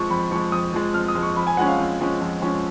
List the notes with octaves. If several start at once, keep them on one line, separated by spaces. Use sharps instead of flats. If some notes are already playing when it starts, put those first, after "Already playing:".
Already playing: F2 F3 G#3 C#6
F2 B5
F3 G#3 C#6
F2 D#6
F3 G#3
F2 F6
D#6
F3 G#3
C#6
F2 B5
G#5
F3 G#3 C#4 F#5
F5
F2
F3 G#3 C#4
F2
F3 G#3 C#4